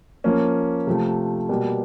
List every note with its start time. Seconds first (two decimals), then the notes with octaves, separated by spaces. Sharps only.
0.24 F3 A#3 C#4
0.87 C3 F3 A3
1.49 B2 G3 A#3